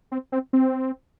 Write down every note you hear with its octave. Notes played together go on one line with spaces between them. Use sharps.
C4
C4
C4